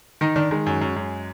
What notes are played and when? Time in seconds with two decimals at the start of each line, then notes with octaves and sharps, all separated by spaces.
0.21 D#3 D#4
0.36 D#3 D4
0.51 D#3 G#3
0.66 F#2
0.81 F#2
0.96 F#2